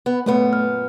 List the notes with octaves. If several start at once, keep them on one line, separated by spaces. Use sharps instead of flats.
B3
F#2 A#2 A3 B3 B4
F6